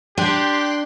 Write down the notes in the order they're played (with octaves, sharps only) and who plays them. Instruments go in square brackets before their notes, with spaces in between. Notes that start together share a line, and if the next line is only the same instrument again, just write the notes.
[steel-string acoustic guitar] D4 [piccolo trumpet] G4 [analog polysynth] G5 C6 F#6